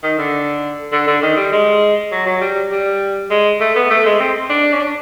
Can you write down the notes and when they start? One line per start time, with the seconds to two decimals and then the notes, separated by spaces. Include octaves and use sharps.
0.03 D#3
0.18 D3
0.92 D3
1.07 D3
1.22 D#3
1.37 G3
1.52 G#3
2.11 F#3
2.26 F#3
2.41 G3
2.71 G3
3.30 G#3
3.60 A3
3.76 B3
3.90 A3
4.05 G#3
4.20 C4
4.50 D4
4.73 C#4
4.79 D4